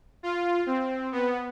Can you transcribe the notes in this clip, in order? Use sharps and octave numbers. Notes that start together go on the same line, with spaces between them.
F4
C4
B3